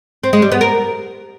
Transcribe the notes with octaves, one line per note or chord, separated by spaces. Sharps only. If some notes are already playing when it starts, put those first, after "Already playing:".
C4
G#3
G3
B3
A#4